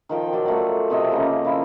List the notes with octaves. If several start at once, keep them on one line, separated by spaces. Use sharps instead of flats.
D#3 F3 G5
F#3 F4 D5
A3 D5
C3 C4 D#5
C#3 A#3
F3 E4